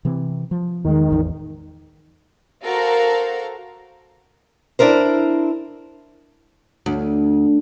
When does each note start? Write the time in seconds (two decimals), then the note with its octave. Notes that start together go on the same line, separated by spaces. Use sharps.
0.05 C3 E3 C4
0.51 F3
0.85 E2 D#3 G#3
1.10 A1 E2
2.65 F#4 A4 A#4 C5 F5 A#5
4.79 D4 E4 A#4 C5
6.86 D2